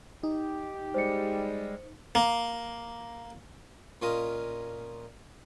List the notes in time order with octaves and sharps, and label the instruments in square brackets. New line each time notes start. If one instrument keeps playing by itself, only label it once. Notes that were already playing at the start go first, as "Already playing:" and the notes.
[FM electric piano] D#4 [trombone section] G4
[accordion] G3 G#3 [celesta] C5 C#7
[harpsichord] A#3
A#2 C#4 F4 A#4 D#5